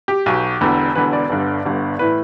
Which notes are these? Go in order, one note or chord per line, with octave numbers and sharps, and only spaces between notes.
G4
B1 B2
E1 E2 D3
E1 E2 D3 B4
D5
G1 G2 D3
G1 G2 D3
A2 E3 B4